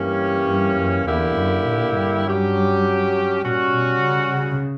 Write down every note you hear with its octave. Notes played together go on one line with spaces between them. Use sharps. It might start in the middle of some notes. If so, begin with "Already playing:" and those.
Already playing: G2 E3 A#3 C#4 G4
G2
F#2
E2 D3 A#3 E4 G4
F#2
A#2
G2
F#3 C#4 G4
A#2 G3 C#4 F#4
B2
C#3
C#3